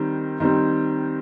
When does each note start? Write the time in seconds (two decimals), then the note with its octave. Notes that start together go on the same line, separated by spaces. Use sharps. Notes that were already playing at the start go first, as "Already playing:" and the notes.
Already playing: D#3 G3 C4
0.40 D#3 G3 C4